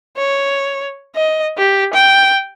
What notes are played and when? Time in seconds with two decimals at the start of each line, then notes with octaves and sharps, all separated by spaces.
0.17 C#5
1.15 D#5
1.58 G4
1.94 G5